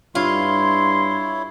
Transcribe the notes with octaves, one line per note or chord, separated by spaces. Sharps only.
G2 E4 F4 C#5 C6